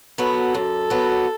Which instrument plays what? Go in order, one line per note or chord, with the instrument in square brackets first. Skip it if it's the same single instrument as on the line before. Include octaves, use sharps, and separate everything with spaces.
[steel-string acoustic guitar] F#3 B3 F#4 [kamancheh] A4
[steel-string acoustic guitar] F#2
F#3 B3 F#4